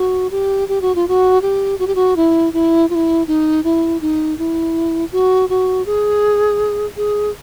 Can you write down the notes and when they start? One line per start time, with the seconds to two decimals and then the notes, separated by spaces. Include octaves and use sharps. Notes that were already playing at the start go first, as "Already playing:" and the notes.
Already playing: F#4
0.31 G4
0.68 G4
0.81 F#4
0.95 F4
1.08 F#4
1.42 G4
1.79 F#4
1.87 G4
1.95 F#4
2.16 E4
2.53 E4
2.90 F4
2.95 E4
3.27 D#4
3.64 E4
4.01 D#4
4.38 E4
5.12 F#4
5.49 F#4
5.86 G#4
6.97 G#4